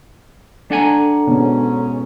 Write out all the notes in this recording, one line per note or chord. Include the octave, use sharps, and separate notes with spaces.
D4 A4 F#5 G#5 A#5
G#2 B2 C#4